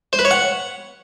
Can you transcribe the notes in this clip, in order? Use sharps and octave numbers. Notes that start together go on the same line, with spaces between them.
C5
B4
C#5
F#5